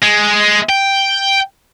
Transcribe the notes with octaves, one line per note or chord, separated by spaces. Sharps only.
G#3
G5